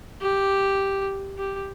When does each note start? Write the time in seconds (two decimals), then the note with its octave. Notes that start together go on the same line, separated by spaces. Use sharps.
0.21 G4
1.38 G4